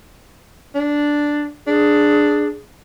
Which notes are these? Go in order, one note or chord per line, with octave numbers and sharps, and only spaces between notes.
D4
D4 G#4